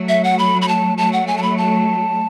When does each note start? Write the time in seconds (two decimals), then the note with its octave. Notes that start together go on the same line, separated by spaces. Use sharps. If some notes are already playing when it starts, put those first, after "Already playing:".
Already playing: F#3 A3
0.09 E5
0.24 F#5
0.39 B5
0.62 B5
0.68 A5
0.98 F#3 A3 A5
1.13 F#5
1.27 G#5
1.38 A5
1.43 B5
1.58 A5